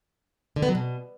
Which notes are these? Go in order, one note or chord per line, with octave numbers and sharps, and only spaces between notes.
D3
B3
F#3
B2